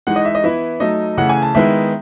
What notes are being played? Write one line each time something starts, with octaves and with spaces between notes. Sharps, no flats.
E3 G#3 D#4 F#5
D#5
E5
D#5
E3 B3 E4 E5
F#3 A3 D#4 D#5
C#3 E3 A3 F#5
G#5
A5
D#3 G#3 B3 E4 E5